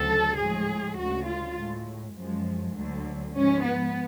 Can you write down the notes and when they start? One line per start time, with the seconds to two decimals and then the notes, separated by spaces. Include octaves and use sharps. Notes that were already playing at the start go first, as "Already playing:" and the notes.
Already playing: D2 C#3 F#3 A4
0.38 A2 F3 G#3 G#4
0.97 D2 C#3 G#3 F#4
1.26 F4
1.56 A2 G#3
2.15 F#2 F3 G#3
2.74 D2 D3 F#3
3.34 G#2 F3 G#3 C#4
3.64 B3